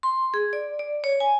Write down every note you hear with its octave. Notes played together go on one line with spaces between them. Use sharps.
C6
G#4
D5
D5
C#5
G#5